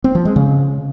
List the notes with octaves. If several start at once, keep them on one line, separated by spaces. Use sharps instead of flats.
C4
F3
G#3
C#3